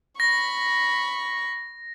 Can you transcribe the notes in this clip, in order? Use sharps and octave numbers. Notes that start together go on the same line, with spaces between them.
B5 C#6 A#6